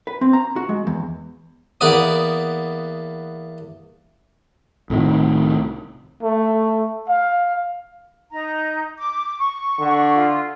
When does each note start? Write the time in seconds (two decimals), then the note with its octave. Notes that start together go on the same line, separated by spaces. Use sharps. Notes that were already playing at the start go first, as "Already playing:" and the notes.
0.07 B4
0.21 C4
0.33 A#5
0.56 F#4
0.69 G#3
0.87 E2
1.81 E2 A#3 B3 D5 D#6
4.90 C2 A2 C3 D#3
6.23 A3
7.09 F5
8.32 D#4 A#5
8.98 D6
9.39 C#6
9.79 D3
10.14 F4